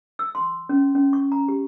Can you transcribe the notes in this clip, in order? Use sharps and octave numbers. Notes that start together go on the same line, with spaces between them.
E6
C6
C#4
C#4
C#6
A#5
G4